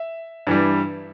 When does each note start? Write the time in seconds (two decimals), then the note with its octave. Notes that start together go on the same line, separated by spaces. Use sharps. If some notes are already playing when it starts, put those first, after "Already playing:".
Already playing: E5
0.47 G2 E3 G3